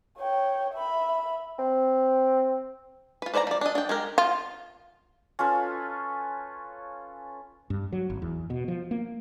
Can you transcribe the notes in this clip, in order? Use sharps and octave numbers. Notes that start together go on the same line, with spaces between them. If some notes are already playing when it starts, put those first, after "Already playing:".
C#5 G5
E5 B5
C4
F4 B4
B4 C5 D5 G#5 A#5
F3 D5
D4 D#5
D4 G5
G#3 G4 A#4
F4
C#4 F4 A4 B4
G2
F#3
G#1
E2
B2
F3
A#3